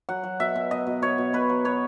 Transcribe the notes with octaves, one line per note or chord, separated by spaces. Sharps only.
F#3 F#5
F#3
B2 E5
B2
B2 D#5
B2
B2 C#5
B2
B2 B4
F#3
B2 C#5